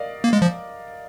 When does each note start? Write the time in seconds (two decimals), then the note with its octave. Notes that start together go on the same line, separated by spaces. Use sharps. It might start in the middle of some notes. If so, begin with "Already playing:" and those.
Already playing: A#4 D5 D#5 F5
0.24 A#3
0.33 G#3
0.42 F3